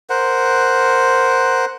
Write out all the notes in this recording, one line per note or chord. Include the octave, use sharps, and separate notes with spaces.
A#4 C5 F#5